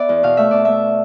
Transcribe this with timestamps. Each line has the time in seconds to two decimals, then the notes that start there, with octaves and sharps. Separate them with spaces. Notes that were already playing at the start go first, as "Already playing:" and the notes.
Already playing: B3 D5 E5
0.09 E2
0.23 B2 F5
0.37 A3 E5
0.51 B2 D5
0.65 A3 E5